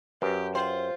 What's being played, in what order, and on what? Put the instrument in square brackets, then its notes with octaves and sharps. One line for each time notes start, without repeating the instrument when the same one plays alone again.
[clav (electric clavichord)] F#2 [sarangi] G4 [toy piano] B4 C5
[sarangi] F4 [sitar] C5 [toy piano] G5 C6